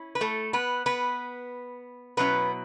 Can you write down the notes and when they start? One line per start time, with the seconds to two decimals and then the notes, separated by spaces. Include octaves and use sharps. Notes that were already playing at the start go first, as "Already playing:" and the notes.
Already playing: C#4 E4
0.15 B4
0.21 A3 A4
0.53 B3 B4
0.86 B3 B4
2.17 B2 F#3 B3 C#4 E4 B4